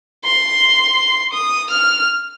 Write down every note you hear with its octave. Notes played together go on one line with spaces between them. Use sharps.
C6
D#6
F6